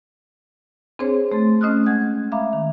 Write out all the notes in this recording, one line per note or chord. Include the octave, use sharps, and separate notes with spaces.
C4 D4 G#4 C5 C#5
A3 C6 A6
A3 C#4 D#5 D#6 F6 F#6
G#3 F#5 G6 G#6
E5 F5 A#5 B5 D6
D#3